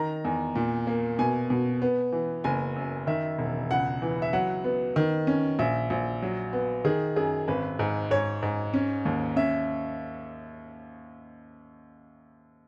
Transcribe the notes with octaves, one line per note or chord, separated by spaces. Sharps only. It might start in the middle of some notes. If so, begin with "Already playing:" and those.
Already playing: D#3 A#5
E2
A#2
A#3
B2 G#5
B2
B3
E3
F#1 G#5
F#2
D#3 E5
E1
C#2 F#5
E3
E5
F#3 F#5
B3
D#3
C#4
A#1 E5
A#1
F#3
B3
D#3 G#4
F#2 G#4
G#1 B4
G#2
G#2 C#5
G#2
C#4
D#2
C#4 E5